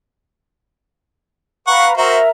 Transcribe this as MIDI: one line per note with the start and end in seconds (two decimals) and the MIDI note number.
1.67 1.97 71
1.67 1.97 77
1.67 1.88 78
1.67 1.97 82
1.67 1.88 85
1.97 2.19 66
1.97 2.29 70
1.97 2.19 72
1.97 2.29 76
1.97 2.29 82